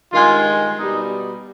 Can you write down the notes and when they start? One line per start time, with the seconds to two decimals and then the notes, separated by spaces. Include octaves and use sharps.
0.11 G2 D#3 G#3 F4
0.78 B2 G3 D#4